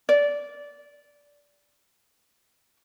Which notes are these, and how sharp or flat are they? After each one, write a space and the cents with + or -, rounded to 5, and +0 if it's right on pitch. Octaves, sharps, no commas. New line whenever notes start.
D5 -15